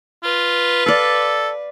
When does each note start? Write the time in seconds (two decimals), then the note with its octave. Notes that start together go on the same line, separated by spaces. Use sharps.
0.23 F4 B4
0.86 A4 D5 F5